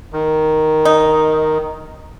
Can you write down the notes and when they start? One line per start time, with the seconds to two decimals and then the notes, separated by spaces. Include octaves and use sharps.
0.13 D#3
0.85 D#4